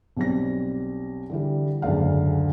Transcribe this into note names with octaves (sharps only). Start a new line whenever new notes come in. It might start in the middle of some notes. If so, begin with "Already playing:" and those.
B1 G3 C4 A#6
D3 E3 G3
F#1 D2 G#2 D3 F5